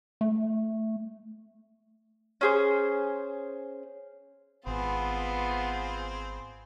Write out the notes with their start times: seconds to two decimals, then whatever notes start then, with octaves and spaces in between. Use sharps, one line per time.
0.21 A3
2.41 C#4 G#4 C5
4.67 G#1 B3 C4 F4 G#4 B5